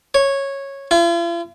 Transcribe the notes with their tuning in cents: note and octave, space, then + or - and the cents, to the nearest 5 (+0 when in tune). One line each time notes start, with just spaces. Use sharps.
C#5 -10
F4 -45